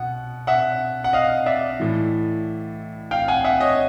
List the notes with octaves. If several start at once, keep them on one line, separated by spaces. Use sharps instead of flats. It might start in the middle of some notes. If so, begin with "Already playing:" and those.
Already playing: B2 F#5
E5 F#5
F#5
D#5 F5
D5 E5
A2 E3
F5 G5
F#5 G#5
E5 F#5
C#5 D#5